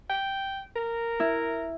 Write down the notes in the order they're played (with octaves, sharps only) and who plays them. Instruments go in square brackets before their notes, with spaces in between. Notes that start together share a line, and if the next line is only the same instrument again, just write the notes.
[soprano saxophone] G5
A#4
[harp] E4